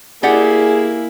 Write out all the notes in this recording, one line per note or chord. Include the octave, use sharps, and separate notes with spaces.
A#3 E4 G4 G#4 D5 F#5